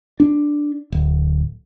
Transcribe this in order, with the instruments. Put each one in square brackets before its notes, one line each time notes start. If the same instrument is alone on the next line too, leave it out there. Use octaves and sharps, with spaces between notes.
[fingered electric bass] D4
D1